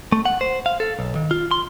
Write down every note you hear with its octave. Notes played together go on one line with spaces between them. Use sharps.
A3
F#5
C5
F5
A4
B1
D#3
F4
C6